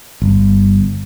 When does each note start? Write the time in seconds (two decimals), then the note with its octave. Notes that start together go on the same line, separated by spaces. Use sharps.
0.22 G1